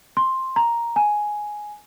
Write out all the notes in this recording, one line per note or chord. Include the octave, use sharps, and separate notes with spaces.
C6
A#5
G#5